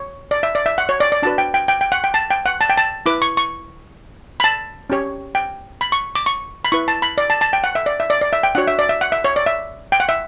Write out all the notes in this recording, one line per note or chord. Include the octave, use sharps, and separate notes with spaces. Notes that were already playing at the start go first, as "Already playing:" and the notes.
Already playing: C#5
D5
E5
D5
E5
F#5
C#5
D5
D5
D4 F#4 B4 A5
G5
G5
G5
G5
F#5
G5
A5
G5
F#5
A5
G5
A5
E4 B4 D6
C#6
C#6
B5
A5
C#4 G4 C#5
G5
B5
C#6
D6
C#6
B5
E4 B4 C#6
A5
B5
D5
A5
A5
G5
F#5
E5
D5
E5
D5
D5
E5
G5
D4 F#4 C#5 F#5
E5
D5
E5
F#5
E5
C#5
D5
E5
G5
F#5
E5